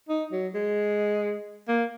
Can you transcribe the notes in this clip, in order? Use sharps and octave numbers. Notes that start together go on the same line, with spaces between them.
D#4
F#3
G#3
A#3